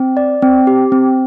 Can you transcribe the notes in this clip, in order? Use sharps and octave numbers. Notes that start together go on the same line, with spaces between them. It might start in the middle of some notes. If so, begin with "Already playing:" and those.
Already playing: C4
D5
C4
G4
C4